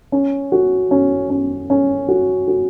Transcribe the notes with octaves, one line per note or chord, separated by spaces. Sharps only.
C#4
F#4
C#4
C#4
C#4
F#4
F#4